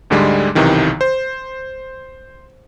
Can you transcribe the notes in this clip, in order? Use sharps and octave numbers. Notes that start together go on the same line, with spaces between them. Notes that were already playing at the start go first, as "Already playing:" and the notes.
D2 G#2 D3 G3 G#3
B1 C3 D#3 E3
C5